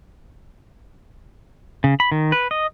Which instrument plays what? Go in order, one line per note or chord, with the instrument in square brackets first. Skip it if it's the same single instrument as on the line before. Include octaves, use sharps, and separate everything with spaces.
[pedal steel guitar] C#3
B5
D#3
B4
D#5